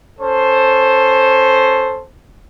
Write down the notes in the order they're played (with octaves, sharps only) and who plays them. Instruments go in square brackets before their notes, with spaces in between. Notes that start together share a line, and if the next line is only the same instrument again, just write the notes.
[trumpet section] C#4 A4 C5